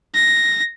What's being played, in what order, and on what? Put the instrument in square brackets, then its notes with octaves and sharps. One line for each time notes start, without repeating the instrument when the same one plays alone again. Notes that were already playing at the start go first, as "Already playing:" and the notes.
[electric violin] A#6